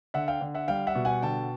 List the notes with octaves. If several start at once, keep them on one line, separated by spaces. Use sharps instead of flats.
D3 E5 F#5
F5 G5
D3
E5 F#5
G3 F5 G5
E5 F#5
B2
F#5 G#5
D3 G5 A5